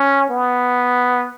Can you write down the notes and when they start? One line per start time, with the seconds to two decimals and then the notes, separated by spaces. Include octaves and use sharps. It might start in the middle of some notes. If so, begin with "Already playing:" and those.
Already playing: C#4
0.30 B3